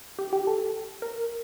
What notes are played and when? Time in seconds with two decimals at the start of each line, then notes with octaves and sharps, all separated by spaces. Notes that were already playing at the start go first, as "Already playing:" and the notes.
0.19 G4
0.33 G4
0.47 A4
1.02 A#4